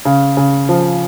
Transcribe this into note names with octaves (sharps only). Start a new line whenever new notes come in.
C#3
C#3
F3